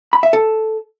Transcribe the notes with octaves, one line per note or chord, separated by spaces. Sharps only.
B5
E5
A4